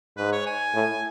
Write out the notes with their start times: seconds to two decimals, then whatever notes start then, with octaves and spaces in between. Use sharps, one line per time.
0.17 G#2 B4
0.32 C#5
0.46 G#5
0.74 A2